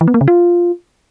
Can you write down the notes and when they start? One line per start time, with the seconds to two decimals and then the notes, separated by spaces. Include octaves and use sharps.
0.01 E3
0.08 B3
0.14 A#3
0.21 C#3
0.28 F4